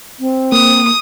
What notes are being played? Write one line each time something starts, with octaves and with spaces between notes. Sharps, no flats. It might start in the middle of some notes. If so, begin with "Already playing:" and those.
C4
A#3 D#6